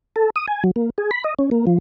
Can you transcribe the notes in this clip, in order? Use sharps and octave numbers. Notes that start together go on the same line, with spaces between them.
A4
D#6
G#5
F#3
A#3
G#4
B5
D#5
C#4
A#3
F3